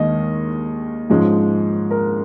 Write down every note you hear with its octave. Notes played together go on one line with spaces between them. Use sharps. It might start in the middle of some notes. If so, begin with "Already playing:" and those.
Already playing: D#2 D#3 G#3 D#5
G#2 F3 G#3 C#4
A#4